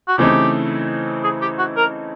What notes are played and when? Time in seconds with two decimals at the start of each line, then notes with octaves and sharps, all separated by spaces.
0.08 F#4
0.18 C#3 E3 A3 C4 D#4 G4
1.24 G#4
1.42 G4
1.59 F#4
1.77 A#4